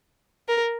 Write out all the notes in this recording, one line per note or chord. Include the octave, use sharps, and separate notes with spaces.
A#4